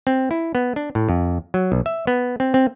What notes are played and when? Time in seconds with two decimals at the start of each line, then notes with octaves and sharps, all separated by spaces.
0.07 C4
0.31 E4
0.55 B3
0.76 D4
0.95 A2
1.09 F2
1.54 F#3
1.72 B1
1.86 E5
2.07 B3
2.40 C4
2.54 C4